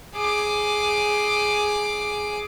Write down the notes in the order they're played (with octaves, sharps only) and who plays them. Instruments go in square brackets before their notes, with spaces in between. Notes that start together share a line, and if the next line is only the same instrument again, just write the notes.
[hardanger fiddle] G#4 D6